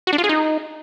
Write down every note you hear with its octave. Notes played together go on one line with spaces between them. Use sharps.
F#4
D4
F4
G#4
D#4